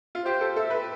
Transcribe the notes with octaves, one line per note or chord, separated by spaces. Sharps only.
F4
G4 C5
A4
A4 E5
B4